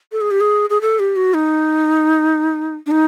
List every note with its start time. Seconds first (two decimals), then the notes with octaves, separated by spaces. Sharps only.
0.12 A4
0.21 G#4
0.31 G4
0.41 G#4
0.70 G#4
0.81 A4
0.99 G4
1.16 F#4
1.34 D#4
2.86 D4
2.91 D#4